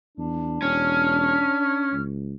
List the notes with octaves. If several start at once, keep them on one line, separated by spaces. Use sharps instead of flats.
E2 D4
E1 C#4 F6
C#2